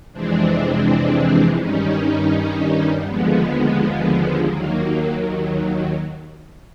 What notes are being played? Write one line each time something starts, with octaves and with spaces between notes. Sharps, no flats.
F2 C3 E3 G#3 C4 D4
G2 D#3 G3 C#4 D#4
D#2 D3 F3 G#3 B3
D#2 D#3 F#3 A#3